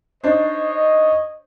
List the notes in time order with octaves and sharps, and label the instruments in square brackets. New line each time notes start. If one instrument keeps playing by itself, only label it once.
[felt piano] D4 D#4 C5 [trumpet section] C#5 D#5